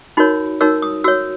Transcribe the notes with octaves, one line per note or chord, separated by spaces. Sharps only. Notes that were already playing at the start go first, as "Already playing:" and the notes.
D#4 F#4 A#4 C#5 B5
D#4 F#4 A#4 C#5 E6
D#6
F#4 C#5 E6